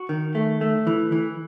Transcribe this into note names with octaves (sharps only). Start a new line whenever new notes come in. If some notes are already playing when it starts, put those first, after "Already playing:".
Already playing: F#4
D#3
A3
A3
E3
E3